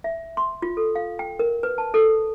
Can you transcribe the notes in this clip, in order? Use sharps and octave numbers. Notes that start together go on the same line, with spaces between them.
E5
C6
F4
A4
F5
G5
A#4
B4
A5
A4